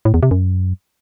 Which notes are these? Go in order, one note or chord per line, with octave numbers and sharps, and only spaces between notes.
A2
E2
C3
F#2